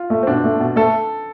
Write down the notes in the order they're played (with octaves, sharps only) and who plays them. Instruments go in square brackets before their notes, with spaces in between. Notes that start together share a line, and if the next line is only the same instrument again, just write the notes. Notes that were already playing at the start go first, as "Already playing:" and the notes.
Already playing: [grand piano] F4
[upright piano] A3
[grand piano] C4
[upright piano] B2 [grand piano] D4
[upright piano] A3
B2
[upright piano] A3 [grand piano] A4